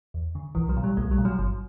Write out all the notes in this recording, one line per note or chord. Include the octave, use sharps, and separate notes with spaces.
E2
D3
B1 E3
F#3
B2
G3
B1 A3
G3
B2
F#3
G1 F#3